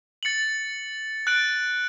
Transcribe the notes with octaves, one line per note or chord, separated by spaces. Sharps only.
A6 C#7 F#7
F#6 A6 D7 F#7